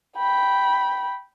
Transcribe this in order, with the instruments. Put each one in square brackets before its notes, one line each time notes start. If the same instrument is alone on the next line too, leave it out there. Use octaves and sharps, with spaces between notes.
[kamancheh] G5 B5